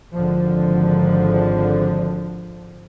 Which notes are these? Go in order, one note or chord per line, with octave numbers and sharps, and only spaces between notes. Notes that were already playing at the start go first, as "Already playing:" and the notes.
G#1 D3 F3